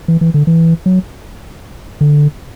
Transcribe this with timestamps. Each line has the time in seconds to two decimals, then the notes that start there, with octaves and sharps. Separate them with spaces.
0.08 E3
0.21 E3
0.34 D3
0.47 E3
0.86 F#3
2.01 D3